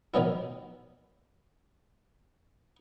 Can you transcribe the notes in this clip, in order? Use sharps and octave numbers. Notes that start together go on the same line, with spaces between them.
D#3 F3 F#3 B3 E4